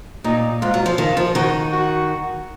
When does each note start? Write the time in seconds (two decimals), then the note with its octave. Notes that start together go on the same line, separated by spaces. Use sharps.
0.24 A#2 D#4
0.62 G#2 F4
0.74 F#3
0.86 F3
0.98 D#3 F4
1.17 F3
1.35 D#3 F#4
1.72 F#4